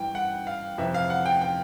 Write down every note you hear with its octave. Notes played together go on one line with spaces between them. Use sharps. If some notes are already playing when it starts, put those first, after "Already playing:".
Already playing: G2 E3 G5
F#5
F5
F2 C3 E3 E5
F5
F#5
G5
G5